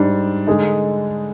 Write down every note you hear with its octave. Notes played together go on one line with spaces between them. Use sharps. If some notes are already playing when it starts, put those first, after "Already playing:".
Already playing: G#2 G3 D4
D3 G#3 D#4